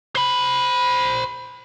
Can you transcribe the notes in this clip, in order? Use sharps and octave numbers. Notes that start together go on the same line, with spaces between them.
C5 B5